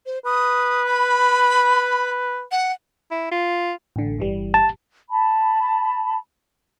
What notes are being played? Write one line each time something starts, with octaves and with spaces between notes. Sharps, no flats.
C5
B4 D#6
B5
F#5
E4
F4
A1 D3
G1 E3 G3
A5
A5 B5